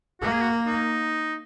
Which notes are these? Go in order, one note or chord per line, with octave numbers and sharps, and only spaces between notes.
A#3 F#4
G#4
F#4
D#4